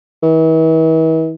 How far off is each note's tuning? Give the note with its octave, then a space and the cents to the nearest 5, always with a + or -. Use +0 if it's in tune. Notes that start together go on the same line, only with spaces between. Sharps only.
E3 -40